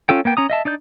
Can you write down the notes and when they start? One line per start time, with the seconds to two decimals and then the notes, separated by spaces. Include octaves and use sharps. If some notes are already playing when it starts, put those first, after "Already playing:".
0.09 C#4 F4 A4 G5
0.25 A#3 B3 G5
0.37 C#4 A#5 D#6
0.50 D#5 E5 A5
0.65 D4 D#4 D5 G6